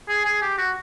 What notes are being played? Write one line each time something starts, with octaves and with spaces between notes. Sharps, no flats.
G#4
G#4
G4
F#4